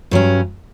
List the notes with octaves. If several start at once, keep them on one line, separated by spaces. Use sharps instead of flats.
G2 F#3 C#4